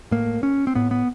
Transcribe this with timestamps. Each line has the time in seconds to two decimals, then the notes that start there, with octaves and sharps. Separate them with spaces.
0.11 A2 A#3
0.43 C#4
0.67 C4
0.75 A2 B3
0.91 B3